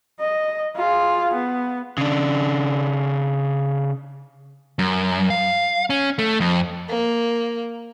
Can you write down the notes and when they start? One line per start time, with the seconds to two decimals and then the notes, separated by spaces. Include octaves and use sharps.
0.20 D#5
0.77 F4 G#4
1.33 B3
1.98 C#3 D4
4.79 F#2
5.30 F5
5.90 C#4
6.19 A3
6.40 F2
6.89 A#3